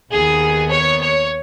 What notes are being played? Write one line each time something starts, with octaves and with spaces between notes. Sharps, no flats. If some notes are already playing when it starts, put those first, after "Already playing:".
D#2 D#3 B3 G#4
C#5
C#5